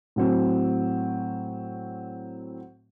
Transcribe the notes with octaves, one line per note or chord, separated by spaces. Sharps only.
A2 F#3 C4